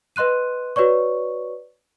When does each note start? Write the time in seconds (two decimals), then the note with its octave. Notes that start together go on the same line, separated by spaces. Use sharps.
0.16 B4 D#5 C6 F#6 D#7
0.76 F#4 B4 C#5 D5 C#6